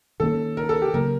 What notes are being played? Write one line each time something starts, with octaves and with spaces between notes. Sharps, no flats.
D#3 G3 A#3 C#4 A4
A#4
A4
G4
C#3 F#3 A#3 C#4 A#4